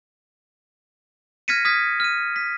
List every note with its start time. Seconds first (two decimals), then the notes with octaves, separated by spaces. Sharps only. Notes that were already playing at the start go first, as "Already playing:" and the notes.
1.48 F6 G#6 A#6 B6 C#7 D#7
1.65 D#6 F6 G#6 B6
2.00 F6 D#7
2.36 B6